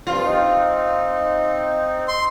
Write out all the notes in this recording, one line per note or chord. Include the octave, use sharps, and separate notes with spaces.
G2 D3 C4 F4
C4 D#4
C6